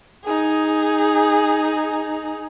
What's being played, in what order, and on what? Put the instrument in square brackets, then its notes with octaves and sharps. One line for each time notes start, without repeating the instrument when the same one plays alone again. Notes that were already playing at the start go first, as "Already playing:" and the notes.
[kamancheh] D#4 G#4